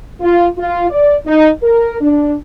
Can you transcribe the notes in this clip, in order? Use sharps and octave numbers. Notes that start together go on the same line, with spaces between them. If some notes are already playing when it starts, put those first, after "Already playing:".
F4
F4
D5
D#4
A#4
D4